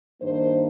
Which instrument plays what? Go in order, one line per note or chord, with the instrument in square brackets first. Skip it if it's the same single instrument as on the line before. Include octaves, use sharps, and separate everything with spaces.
[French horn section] G2 D#3 A#3 D4 C5